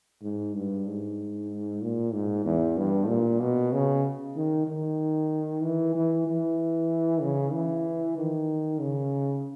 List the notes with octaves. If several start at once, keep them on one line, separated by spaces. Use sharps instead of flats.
G#2
G2
G#2
A#2
G#2
E2
G2
A#2
B2
C#3
D#3
D#3
E3
E3
E3
C#3
E3
D#3
C#3